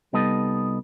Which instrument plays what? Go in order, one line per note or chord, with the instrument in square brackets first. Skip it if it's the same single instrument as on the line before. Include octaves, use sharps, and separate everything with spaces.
[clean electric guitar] C2 G3 B3 D#4 A4 D#5